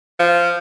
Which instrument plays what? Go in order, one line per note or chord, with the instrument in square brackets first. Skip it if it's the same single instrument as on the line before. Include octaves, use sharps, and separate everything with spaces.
[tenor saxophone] F3